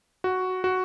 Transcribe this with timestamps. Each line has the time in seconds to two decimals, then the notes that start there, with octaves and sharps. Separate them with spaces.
0.24 F#4
0.64 F#4